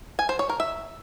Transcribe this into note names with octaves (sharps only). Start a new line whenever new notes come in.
G#5
C5
C#5
A#4
E5